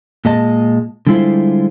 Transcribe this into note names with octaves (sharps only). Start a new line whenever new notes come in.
A#2 G#3 D#5 A5
D3 G3 G#3 E4 F4 C5